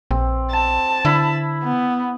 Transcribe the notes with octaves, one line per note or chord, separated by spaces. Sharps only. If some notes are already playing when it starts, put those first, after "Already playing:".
A#1 C4
A5
D3 E4 B5
B3